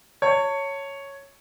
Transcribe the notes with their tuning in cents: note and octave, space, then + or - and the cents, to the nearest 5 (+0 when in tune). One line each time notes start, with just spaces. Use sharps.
C#5 +0 A5 +35